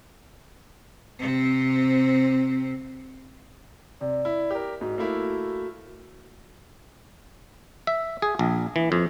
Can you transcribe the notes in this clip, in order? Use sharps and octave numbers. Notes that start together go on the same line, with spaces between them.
C3 C4
C3 D5
E4
G4 A#4
G#2 F#4
A3 A#3 E4
E5
G#4
A#1
E3
F2